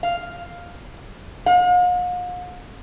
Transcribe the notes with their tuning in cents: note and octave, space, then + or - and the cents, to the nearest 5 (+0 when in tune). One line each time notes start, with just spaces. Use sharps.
F5 +5
F5 +45